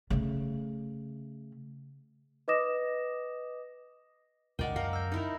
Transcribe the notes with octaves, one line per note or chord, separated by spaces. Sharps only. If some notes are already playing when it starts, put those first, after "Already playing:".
C#3 A3
B4 D#5 D6 D#6 A#6 E7
C#2 A2 D#3 A#4 D5 D#5 F#5 G5
F#2 A#4 F5 A5
E6 G6
D#4 E4 A#4